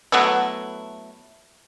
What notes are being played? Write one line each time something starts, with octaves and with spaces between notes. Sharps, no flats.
F#3 A3 B3 E4